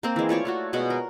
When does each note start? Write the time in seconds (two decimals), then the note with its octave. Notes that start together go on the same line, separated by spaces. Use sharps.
0.03 A#3 C4 A#4
0.16 E3 G#3
0.29 A3 F4 C#5 D5
0.45 A3 F4 F#4
0.73 B2 G#3 F#5
0.90 A#4